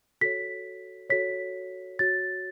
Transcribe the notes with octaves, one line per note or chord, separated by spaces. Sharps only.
F#4 A4 C#5 B6
F#4 A4 C#5 B6
F#4 C#5 A6